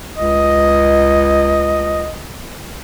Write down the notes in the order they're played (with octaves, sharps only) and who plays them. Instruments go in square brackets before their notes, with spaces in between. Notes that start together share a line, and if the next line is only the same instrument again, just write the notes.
[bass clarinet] C#2 [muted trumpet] D#5